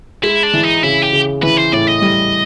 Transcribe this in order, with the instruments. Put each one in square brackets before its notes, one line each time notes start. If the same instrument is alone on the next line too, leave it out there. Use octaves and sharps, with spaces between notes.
[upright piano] G#3 [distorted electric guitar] E4
[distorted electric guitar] D4
[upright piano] E3
[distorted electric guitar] D#4
[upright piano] C#3 [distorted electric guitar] E4
[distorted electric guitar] G4
[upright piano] C#3
[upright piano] E3 [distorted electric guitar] B4
[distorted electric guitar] C5
[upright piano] A2 [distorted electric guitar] D5
[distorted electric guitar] D#5
[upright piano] G3